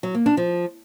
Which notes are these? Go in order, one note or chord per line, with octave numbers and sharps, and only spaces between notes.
F#3
A#3
D4
F3